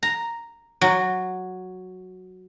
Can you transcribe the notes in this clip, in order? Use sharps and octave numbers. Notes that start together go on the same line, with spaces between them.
A#5
F#3